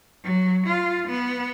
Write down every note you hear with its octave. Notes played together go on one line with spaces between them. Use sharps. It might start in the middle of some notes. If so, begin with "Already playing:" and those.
F#3
F4
B3